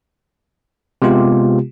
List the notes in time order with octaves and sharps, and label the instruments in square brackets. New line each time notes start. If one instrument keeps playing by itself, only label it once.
[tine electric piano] C3 G#3 B3 F4 G4